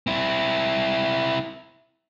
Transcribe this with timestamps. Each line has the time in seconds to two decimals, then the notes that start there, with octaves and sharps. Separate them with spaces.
0.07 C4 E4